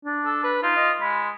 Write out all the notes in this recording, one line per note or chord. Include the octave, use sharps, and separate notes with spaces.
D4
A4
B4
D#4 F4
D#5
G#3 B5